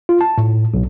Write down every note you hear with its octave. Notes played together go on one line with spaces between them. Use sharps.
F4
A5
A2
B1